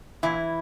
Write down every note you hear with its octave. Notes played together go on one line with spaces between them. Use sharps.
A#2 E3 E4